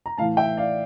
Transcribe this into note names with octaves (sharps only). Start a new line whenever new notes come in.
A#5
A2 E3 F5 A5
E5 G5
D5 F5